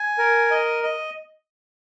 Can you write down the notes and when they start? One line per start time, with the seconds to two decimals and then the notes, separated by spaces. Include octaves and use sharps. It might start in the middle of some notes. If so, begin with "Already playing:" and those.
Already playing: G#5
0.18 A#4
0.51 D#5
0.83 D#5